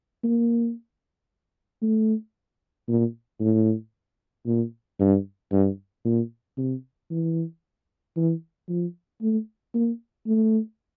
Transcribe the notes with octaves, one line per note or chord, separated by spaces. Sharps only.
A#3
A3
A#2
A2
A#2
G2
G2
A#2
C3
E3
E3
F3
A3
A#3
A3